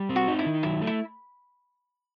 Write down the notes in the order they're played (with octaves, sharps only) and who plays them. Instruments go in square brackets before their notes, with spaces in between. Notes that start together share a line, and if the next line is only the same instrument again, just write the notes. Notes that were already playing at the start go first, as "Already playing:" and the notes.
Already playing: [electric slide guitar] G3
C4
[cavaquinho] F#4
[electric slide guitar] D#4
[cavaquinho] E4
[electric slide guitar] D#3
[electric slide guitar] F#3 [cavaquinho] E4
[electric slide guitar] A3
[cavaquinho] E4